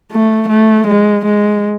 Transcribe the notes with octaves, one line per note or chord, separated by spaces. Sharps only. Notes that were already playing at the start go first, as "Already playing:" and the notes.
A3
A3
G#3
G#3